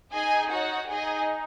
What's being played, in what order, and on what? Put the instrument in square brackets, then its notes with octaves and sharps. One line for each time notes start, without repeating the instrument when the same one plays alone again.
[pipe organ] D#4 [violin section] G#4 D#5 G#5
[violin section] F#4 C#5 F#5
[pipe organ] D#4 [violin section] G#4 D#5 G#5